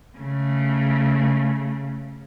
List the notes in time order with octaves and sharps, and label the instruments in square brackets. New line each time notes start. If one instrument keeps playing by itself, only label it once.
[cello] C#3 A3